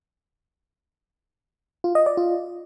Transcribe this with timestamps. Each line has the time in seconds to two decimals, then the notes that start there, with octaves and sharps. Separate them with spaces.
1.84 F4
1.95 D#5
2.06 D5
2.17 F4